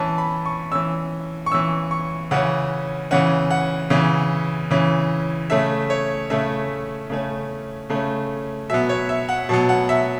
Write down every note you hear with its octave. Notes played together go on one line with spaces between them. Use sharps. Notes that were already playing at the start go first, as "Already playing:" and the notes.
Already playing: E3 C#4 A5
B5
C#6
E3 C#4 E6
C#6
E3 C#4 E6
C#6
C#3 E3 C#4 F#5
C#3 E3 C#4 F#5
F#5
C#3 E3 C#4
C#3 E3 C#4
C#3 A3 C#4 E5
C#5
C#3 A3 C#4 E5
C#3 A3 C#4
C#3 A3 C#4
B2 F#3 B3 E5
C#5
E5
F#5
B2 F#3 B3 A5
F#5
E5